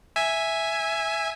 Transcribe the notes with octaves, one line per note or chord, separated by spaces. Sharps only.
E5 G#5